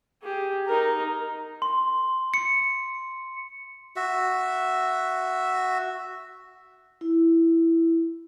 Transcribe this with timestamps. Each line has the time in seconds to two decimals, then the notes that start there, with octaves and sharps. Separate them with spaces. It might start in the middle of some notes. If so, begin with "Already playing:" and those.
0.23 G4 G#4
0.67 D#4 A#4
1.62 C6
2.34 C#7
3.96 F#4 E5
7.01 E4